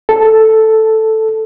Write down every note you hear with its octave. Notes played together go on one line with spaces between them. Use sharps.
A4